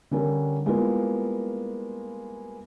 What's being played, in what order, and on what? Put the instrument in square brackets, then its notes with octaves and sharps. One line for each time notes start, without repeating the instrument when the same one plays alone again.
[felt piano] D3 G3 C#4 A#4
G3 G#3 A#3 B3 E4 F4